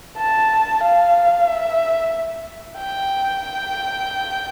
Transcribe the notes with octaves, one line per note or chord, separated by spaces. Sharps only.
A5
F5
E5
G5